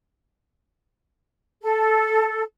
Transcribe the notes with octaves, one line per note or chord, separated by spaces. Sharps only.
A4